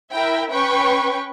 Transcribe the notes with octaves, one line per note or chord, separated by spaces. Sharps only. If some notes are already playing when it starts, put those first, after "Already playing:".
E4 A#4 E5 G5
C#4 B4 G5 C#6